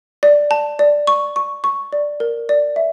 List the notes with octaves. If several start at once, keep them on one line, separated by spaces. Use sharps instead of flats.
D5
A5
D5
C#6
C#6
C#6
D5
A#4
D5
E5